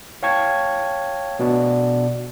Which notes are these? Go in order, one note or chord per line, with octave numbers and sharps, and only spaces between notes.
C#5 F5 G5 A5 C#6 G#6
B2 B3 D4 F#4 D5